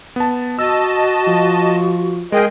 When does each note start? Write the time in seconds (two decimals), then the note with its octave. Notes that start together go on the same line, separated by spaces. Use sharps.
0.16 B3 A5
0.59 F#4 D#5 A5 E6
1.27 F3
2.32 G#3 G#4 A#4 D#5 G5